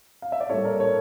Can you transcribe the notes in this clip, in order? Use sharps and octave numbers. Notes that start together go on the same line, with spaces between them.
F5
E5
D5
A2 G3 A#3 A4 C#5
A#4 D5
A4 C#5